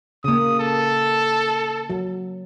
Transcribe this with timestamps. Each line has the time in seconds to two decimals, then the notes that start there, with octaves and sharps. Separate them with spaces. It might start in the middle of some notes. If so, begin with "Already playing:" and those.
0.24 C#3 A#3 D#6
0.59 A4
1.90 F#3